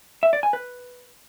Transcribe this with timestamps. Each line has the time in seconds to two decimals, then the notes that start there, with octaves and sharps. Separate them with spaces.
0.23 E5
0.33 D5
0.43 G#5
0.53 B4